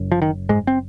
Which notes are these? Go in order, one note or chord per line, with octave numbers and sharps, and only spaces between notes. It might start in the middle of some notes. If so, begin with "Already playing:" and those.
Already playing: F#1 F#2
F3
D#3
G#2 G#3
C4